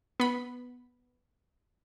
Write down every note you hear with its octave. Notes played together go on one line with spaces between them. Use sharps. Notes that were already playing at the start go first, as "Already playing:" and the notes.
B3 B5